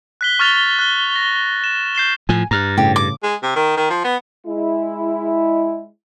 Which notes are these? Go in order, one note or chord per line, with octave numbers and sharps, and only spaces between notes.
F#6 B6 G7
C#6 F6 A6 F7 G7
F#6 G7
A#6
E7
G6 C7 E7 G7
A2 F3 G#5
G2 A#5 F6 F#6
A2 C#3 G4
D6
G#3
C3
D#3
D#3
F3
B3
G#3 E4